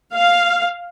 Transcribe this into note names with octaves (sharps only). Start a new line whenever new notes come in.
F5